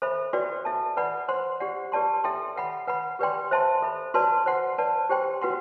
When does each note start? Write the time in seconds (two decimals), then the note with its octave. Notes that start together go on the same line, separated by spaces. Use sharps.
0.02 A4 C5 E5 B5
0.33 F#4 B4 D5 G5 C6
0.65 A4 E5 A5
0.97 B4 D5 F#5 B5
1.28 C5 F#5 C6
1.60 G4 D5 F#5
1.92 G4 B4 D5 A5 C6
2.24 A4 E5 G5 C6
2.56 B4 F#5 B5
2.87 B4 F#5 B5
3.19 G4 B4 D5 G5 C6
3.51 C5 E5 A5 C6
3.82 A4 E5 B5
4.14 F#4 B4 D5 A5 C6
4.46 C5 F#5 C6
4.78 B4 D5 A5
5.10 G4 C5 G5 C6
5.41 F#4 B4 F#5 C6